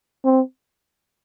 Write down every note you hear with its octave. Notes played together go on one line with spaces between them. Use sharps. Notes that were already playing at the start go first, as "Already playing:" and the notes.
C4